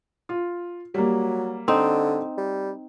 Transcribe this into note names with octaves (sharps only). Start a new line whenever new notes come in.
F4
F#3 G3 A#3
D3 C4 D#4
G3